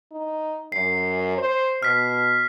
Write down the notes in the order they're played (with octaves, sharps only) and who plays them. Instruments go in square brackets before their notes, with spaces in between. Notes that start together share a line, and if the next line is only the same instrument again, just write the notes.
[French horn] D#4
[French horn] F#2 [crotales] C7
[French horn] C5
[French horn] B2 [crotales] F6 B6